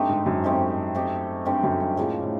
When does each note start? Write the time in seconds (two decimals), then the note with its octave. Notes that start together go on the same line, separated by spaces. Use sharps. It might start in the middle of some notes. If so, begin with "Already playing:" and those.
Already playing: G2 A3 C4 D#4 G4
0.09 G#2
0.26 F#2
0.43 A3 C4 D#4 G4
0.95 A3 C4 D#4 G4
1.45 G2 A3 C4 D#4 G4
1.63 F#2
1.80 G2
1.97 A2 C#3 F3 A#3
2.22 A2